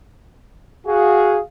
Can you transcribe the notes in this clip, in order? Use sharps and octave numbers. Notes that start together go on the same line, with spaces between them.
F#4 G#4 F5